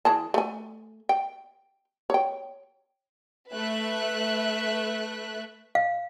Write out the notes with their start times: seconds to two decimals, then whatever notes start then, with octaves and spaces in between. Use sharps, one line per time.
0.05 E3 G#4 A5
0.34 A3 G#5
1.09 G5
2.10 C#5 G5
3.53 A3 B4 E5 F#6
5.75 F5